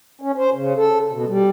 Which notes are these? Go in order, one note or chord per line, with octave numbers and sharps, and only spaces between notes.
C#4
C5
C#3
A4
B2
G3